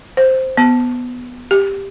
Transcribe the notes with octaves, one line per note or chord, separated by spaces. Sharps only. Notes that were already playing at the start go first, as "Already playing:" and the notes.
C5
B3
G4